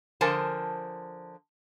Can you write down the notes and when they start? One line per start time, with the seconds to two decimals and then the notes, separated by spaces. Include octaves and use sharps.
0.21 D3 F3 A#4 C5 G#5 A5